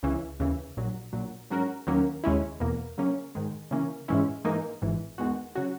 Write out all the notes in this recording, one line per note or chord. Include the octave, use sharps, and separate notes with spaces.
C#2 C#3 E3
D#2 C#3 E3
A#1 A#2 F#3
A#1 A#2 F#3
G#2 F#3 C#4 F#4 A#4
D#2 D#3 F#3 A#3 C#4
D#2 C#3 G#3 C#4 E4
E2 B2 A#3
C#3 F#3 A#3 C#4
G#2 D#3 G#3
C#3 E3 A#3 C#4
G#2 E3 G#3 C#4 E4
G#2 E3 A#3 D#4
G#1 G#2 E3
E2 D#3 G#3 B3 F#4
C#3 F#3 C#4 F#4